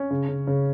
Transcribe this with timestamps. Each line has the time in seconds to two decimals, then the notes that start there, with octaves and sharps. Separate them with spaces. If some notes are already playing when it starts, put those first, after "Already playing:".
Already playing: C#4
0.11 C#3
0.28 C#3
0.47 C#3